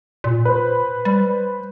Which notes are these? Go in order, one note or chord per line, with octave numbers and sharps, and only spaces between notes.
A#2
B4 C5
G3